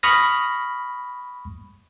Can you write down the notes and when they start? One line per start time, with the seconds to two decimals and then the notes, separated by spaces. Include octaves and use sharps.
0.03 B5 C#6 D#6 F6 A#6